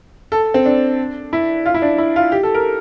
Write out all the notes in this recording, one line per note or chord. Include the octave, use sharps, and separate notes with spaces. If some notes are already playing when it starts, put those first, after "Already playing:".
A4
C4
D4
E4
F4
E4
D4
E4
F4
G4
A4
A#4